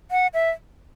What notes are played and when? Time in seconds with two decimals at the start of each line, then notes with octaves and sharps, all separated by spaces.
0.11 F#5
0.34 E5